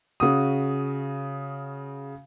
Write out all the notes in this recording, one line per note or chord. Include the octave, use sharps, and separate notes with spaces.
C#3 F#4 D#6